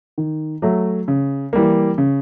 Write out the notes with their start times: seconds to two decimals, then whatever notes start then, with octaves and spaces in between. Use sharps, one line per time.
0.18 D#3
0.62 F#3 A3
1.08 C#3
1.53 E3 G3 A#3
1.98 C#3